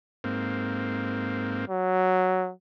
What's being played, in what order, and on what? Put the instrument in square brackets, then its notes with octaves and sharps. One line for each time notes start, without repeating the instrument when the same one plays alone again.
[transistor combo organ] G#2 A#3 C4
[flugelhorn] F#3